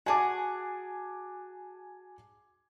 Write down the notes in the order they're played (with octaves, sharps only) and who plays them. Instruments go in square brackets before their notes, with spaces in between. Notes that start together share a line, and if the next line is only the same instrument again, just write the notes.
[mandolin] F#4 G#4 [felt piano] G#5 A5 D6